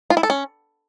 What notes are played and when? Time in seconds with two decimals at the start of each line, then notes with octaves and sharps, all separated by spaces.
0.10 F4
0.17 E4
0.23 A4
0.30 C#4